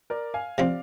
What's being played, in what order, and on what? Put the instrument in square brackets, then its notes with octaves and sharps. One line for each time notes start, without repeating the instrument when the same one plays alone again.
[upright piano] A#4 D5
F5 G#5
[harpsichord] C3 F3 C4 [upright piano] D5 F5